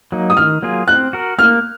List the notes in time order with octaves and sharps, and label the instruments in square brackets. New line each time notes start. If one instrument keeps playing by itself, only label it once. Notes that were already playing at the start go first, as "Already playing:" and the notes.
[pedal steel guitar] F#3 A#3 D#4
[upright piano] D#6
[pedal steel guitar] D#3 [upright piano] F6
[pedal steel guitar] F#3 A#3 F4 G#4
[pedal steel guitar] C4 [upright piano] F#6
[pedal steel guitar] F#4 A#4
[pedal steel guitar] A#3 [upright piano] F6